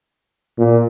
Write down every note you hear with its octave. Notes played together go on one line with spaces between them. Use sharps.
A#2